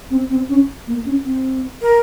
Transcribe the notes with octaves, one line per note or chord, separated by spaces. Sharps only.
C4
C4
C#4
A#3
C#4
C4
A#4